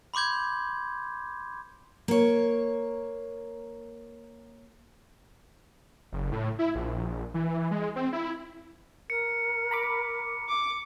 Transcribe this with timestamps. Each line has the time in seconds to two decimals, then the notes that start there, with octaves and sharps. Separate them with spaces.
0.14 B5 C6 D6 G6 G#6
2.08 A#3 C#5
6.12 F#1
6.32 A2
6.59 E4
6.75 A#1
7.34 E3
7.71 G#3
7.96 C4
8.13 E4
9.10 A#4 C#7
9.71 A#5 B5 D6
10.49 D6